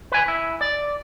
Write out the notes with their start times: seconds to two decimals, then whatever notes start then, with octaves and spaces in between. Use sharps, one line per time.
0.12 B4 G#5
0.28 E4
0.61 D5